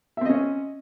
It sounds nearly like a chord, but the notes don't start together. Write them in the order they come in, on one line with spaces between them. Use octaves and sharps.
E5 C4 D#5 C#4